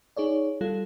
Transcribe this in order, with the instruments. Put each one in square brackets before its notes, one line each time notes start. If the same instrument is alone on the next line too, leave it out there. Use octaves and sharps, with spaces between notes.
[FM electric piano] D#4 G#4 C#5 D5
G3 F4 A4